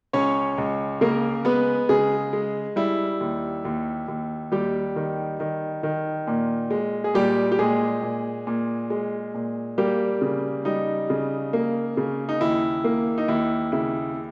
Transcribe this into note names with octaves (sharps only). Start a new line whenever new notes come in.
C#2 C#4 C#5
C#2
C#3 A#3 A#4
G#3 B3 B4
C#3 G#3 G#4
G#3
G3 E4
D#2
D#2
D#2
D#2 G3 G4
D#3
D#3
D#3
A#2
G#3
G#4
A#2 G3 G4
G4
A#2 G#3 G#4
A#2
A#2
G#3
A#2
G3 A#3 G4
C#3
G3 D#4
C#3
A#3
C#3
D#4
D#2 E4
A#3
D#4
D#2 E4
C#3 E4